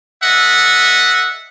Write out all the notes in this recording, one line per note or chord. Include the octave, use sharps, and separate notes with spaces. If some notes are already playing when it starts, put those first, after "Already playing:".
A4 D#5 E5 F#5